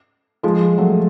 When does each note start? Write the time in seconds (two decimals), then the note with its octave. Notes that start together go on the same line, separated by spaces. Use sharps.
0.43 F3 G#3
0.78 F#3 A3